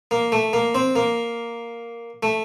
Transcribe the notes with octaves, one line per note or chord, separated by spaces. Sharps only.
A#3
A3
A#3
C4
A#3
A3